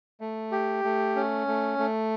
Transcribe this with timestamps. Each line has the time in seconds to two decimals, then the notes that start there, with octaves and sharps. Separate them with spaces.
0.21 A3
0.52 G4
0.84 A3
1.16 C#4
1.47 A3
1.78 A3